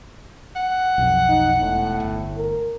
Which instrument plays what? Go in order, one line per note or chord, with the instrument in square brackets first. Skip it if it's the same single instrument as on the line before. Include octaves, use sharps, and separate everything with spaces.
[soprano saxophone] F#5
[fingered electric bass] B1 F2
[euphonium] D#4
[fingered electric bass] E1 [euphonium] A2
[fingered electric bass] G1
[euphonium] A#4